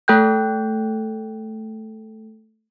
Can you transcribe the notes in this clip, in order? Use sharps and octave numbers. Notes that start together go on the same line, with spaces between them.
A3 A4 G5 F#6 G6